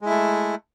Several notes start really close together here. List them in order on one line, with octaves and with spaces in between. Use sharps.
G#3 E4 A3